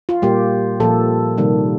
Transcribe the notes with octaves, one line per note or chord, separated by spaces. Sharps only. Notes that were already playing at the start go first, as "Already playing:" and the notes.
F4
A#2 G3 A#3 G4
A#2 F3 A#3 A4
C3 D#3 G3 A#3